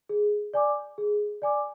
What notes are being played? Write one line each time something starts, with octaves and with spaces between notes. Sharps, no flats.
G#4
D5 G#5 D6
G#4
D5 G#5 D6